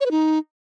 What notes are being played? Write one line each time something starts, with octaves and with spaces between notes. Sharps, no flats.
C#5
B4
D#4